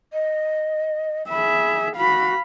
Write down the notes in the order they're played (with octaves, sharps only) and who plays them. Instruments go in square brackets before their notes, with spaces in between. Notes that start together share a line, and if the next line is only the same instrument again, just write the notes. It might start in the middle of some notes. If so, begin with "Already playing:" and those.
[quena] D#5
[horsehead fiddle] G#4 E5 [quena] B5
[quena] F#4 [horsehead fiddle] F5 B5